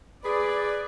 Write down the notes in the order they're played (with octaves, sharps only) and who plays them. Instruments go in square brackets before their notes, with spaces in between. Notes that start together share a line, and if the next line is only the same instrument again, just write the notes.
[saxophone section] G#4 B4 [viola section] D5